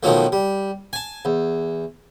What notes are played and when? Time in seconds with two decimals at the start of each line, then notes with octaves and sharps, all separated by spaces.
0.03 B2 D#3 F3 F#3 A3
0.32 G3
0.93 G#5 A5
1.25 E2